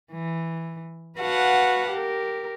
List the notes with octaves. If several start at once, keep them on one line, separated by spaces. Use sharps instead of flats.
E3
F#4 B4 F5 F#5 A5
G4 A#4